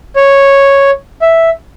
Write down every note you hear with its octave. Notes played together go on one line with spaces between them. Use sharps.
C#5
E5